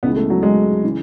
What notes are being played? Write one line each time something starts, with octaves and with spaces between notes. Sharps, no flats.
C#2 C#3 E3 B3
A3
F#3
G#3
C#3 E3